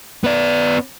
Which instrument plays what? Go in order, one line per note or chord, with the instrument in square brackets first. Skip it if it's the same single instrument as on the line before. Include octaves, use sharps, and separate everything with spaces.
[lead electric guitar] B3 D5